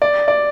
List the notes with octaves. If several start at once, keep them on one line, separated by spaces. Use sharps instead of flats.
D5
D5